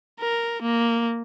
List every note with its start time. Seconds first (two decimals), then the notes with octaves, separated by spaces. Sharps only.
0.20 A#4
0.62 A#3